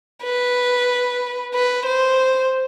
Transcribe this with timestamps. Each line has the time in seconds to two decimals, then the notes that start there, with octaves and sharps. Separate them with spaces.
0.23 B4
1.54 B4
1.86 C5